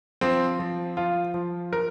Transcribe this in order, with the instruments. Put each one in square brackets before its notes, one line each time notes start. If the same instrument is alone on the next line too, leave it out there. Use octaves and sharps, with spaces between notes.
[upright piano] F3 C4
F3
F3 F4
F3
F3 A#4